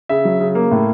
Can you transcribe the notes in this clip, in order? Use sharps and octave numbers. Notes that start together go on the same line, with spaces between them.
C#3 E5
F#3
C#3
A#3
A2